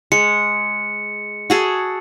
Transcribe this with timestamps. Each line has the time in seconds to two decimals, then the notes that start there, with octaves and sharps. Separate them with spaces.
0.12 G#3 C#7
1.50 F#4 G#4 A4